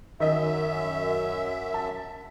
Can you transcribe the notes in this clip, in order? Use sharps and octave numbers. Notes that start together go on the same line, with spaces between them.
F#2 D#3 D#5 E5
A5